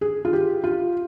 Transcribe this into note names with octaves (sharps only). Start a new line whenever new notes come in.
G#4
F4
G4
F4